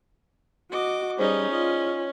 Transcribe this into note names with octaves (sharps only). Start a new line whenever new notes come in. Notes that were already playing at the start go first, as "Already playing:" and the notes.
F#4 D#5 D6
G3 C#4 D#4 G#4 C5 D5 D#5
F4 D#5